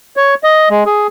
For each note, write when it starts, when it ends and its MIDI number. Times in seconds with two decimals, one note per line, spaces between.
0.17 0.34 73
0.43 0.69 75
0.70 0.84 56
0.86 1.07 68